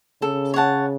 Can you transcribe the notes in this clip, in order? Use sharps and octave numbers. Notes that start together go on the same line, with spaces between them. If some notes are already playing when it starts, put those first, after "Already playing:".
C#3 A4
C#5 F#5 A5